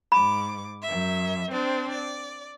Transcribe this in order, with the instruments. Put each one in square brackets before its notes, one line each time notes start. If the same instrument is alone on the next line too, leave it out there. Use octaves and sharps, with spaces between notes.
[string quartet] G#2 D6 [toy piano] B5
[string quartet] F#2 E5
C4 D4 C5
D5